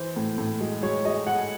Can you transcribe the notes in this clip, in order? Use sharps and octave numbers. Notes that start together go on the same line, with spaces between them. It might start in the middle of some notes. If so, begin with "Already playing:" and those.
Already playing: E3 C5
A2
A2
G#3
G#3 C#5
G#3 D#5
G#3 F#5